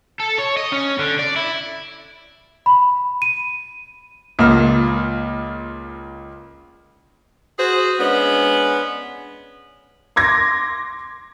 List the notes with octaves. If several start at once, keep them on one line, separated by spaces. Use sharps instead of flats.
A4
C#5
D#5
C#4
D3
D5
E4
B5
D#7
C#2 A#2 A#3 F6
F#4 G#4 C5
G#3 B3 C#4 D4
C6 D6 G#6 A#6